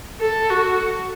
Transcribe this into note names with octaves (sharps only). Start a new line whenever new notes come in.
A4
F#4